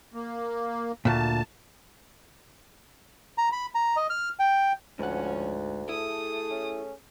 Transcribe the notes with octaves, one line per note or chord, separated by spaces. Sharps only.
A#3
D2 A#2 A5
A#5
B5
A#5
D#5
F6
G5
D2 G#2 F3 C#4 F#5
A3 E4 G#4 A4 D#6
C#4